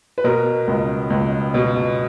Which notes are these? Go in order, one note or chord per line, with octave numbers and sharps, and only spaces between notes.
B4
B2 A#4
C#2
C#2
B2